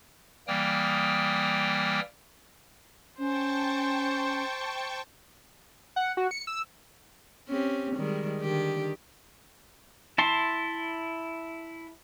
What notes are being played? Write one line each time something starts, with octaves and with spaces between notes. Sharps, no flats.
E3 G3 A#3 G5 D#6 F6
C#4 C5 G5 A5 C#6
F#5
F#4
C#7
E6
C4 C#4 G4
D#3 G3 G#3
D3 D#3 G4
E4 A5 C6